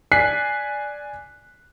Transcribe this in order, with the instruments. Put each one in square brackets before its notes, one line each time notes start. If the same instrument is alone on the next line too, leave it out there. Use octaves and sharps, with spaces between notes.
[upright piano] D5 G#5 F#6 B6 C7